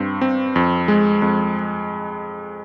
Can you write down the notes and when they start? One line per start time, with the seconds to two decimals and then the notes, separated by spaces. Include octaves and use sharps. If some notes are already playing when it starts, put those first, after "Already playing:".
Already playing: G2 C4
0.21 C4
0.56 F2
0.88 G#3
1.22 F2